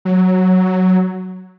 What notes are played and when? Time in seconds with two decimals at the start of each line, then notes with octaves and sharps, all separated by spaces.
0.05 F#3